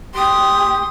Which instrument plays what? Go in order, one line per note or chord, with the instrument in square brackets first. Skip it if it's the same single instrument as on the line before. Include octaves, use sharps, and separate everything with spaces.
[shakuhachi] G4 [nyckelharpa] C6 D#6